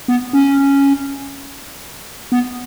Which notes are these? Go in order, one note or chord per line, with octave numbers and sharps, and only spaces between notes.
B3
C#4
B3